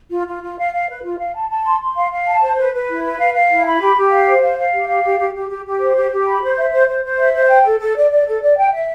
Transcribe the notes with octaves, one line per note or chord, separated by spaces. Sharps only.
F4
F4
F4
F5
F5
B4
F4
F5
A5
A5
C6
C6
F5
F5
A5
C5
B4
B4
E4
B4
F5
F5
E4
B5
G4
G4
F5
C5
F5
F5
G4
F5
G4
G4
G4
G4
G4
C5
G4
G4
B5
C5
E5
C5
C5
C5
E5
C5
G5
A4
A4
D5
D5
A4
D5
G5
E5